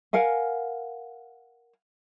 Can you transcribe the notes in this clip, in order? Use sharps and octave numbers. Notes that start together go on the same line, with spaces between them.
A#4 F5 F#5 G#5